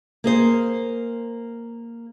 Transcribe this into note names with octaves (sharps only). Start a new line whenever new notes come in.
A#3 G#4 C5